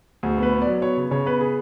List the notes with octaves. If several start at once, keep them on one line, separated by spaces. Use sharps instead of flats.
D2 G#4
B3
B4
B3
D5
F#3
B3 C#5
C#3
C#3 C#5
B3 B4
G#4